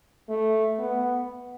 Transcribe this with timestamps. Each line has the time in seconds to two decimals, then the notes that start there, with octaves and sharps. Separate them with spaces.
0.29 A3
0.79 B3